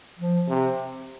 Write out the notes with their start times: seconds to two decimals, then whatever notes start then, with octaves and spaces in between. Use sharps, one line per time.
0.19 F3
0.48 C3